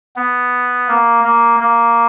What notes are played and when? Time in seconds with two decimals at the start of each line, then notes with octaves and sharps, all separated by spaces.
0.16 B3
0.88 A#3
1.24 A#3
1.60 A#3